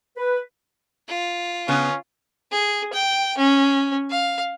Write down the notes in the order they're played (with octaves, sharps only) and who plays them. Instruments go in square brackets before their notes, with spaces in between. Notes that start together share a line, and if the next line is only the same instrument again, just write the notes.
[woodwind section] B4
[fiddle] F4
[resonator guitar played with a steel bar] C#3 B3 [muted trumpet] C#4
[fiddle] G#4
G5
C#4
F5